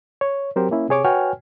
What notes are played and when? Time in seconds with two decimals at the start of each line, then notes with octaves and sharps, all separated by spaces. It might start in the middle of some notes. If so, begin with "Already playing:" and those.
0.21 C#5
0.56 F#3 C4 G4 A#4 C5
0.71 A#3 C#4 E4
0.89 C3 G#4 C#5 D6
1.04 F#4 B4 C#5 G5 G#5 F6